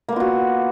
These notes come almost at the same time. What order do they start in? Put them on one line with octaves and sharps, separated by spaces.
A#3 B3 F4 F#4